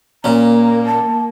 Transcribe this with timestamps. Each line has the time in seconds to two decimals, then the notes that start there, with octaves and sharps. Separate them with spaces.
0.24 A#2 A#3 C#4 A#5
0.86 A5